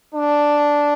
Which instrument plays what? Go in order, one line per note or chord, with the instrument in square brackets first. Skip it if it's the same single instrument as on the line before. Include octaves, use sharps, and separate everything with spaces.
[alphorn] D4